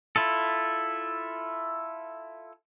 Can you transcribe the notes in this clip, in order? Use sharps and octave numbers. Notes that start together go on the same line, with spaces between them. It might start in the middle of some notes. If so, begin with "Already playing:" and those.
E4 F4 A4